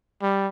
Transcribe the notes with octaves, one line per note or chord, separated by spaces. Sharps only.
G3